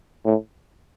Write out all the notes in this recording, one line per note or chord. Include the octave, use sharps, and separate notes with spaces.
A2